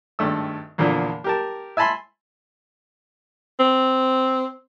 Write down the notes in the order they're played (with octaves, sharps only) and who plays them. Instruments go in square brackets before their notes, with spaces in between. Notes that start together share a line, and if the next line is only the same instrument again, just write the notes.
[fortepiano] G#1 G2 A3 E6
E2 A#2 D3 F3
G4 A#4 A5
E5 G#5 A5 B5 C6
[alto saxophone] C4